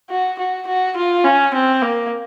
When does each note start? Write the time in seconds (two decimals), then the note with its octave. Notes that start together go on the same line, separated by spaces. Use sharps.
0.09 F#4
0.39 F#4
0.67 F#4
0.97 F4
1.24 C#4
1.54 C4
1.82 A#3